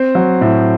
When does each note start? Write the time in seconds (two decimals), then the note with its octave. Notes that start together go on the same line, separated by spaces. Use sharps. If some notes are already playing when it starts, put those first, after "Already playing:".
Already playing: C4 C5
0.15 F#3
0.41 A2